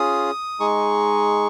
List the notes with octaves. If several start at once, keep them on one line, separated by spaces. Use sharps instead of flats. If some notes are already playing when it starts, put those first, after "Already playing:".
Already playing: C#4 F4 G#4 D#6
G#3 D#4 G#4 C#6